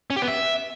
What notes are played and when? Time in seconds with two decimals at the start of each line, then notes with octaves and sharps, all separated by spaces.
0.10 C#4
0.16 G4
0.22 B3
0.28 E5